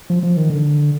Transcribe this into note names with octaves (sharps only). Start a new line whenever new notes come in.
F3
F3
D#3
D3